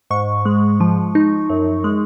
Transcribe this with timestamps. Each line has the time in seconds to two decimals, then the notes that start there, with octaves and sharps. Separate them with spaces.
0.11 G#2 C#6
0.45 G#3
0.80 F3
1.15 D#4
1.50 F#2
1.84 G#3